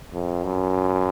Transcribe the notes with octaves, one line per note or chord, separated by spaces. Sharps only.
F2
F#2